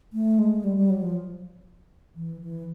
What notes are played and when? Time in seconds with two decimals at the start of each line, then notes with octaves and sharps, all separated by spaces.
0.13 A3
0.39 G#3
0.64 G3
0.77 G3
0.90 F#3
1.02 F3
2.16 E3
2.41 E3